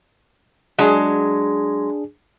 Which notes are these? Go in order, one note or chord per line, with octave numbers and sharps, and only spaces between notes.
F#3 G#3 D4 G#4